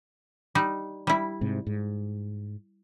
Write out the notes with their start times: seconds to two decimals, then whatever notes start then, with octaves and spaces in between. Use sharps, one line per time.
0.55 G3 D#4
1.07 G3 E4
1.41 G#2 C3
1.67 G#2